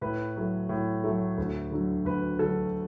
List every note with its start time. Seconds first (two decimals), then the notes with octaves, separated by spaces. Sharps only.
0.01 A2 B4
0.36 F#3 A3
0.69 A2
1.04 F#3 A3
1.38 D2
1.71 D3 F#3
2.05 D2 B4
2.39 D3 F#3 A4